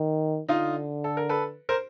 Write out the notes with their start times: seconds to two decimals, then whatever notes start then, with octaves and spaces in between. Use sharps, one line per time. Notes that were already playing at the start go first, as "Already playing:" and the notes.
Already playing: D#3
0.49 D3 D#4 F4
1.04 A4
1.17 A#4
1.29 A4 B4
1.69 A#4 C5